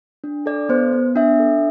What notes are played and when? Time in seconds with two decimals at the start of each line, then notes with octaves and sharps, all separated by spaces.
0.24 D4
0.46 A4 D5
0.69 B3 C5
0.92 B3
1.16 D4 E5
1.40 A4